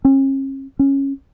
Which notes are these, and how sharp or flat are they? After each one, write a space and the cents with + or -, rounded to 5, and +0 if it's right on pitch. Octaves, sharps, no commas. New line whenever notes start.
C#4 -40
C#4 -10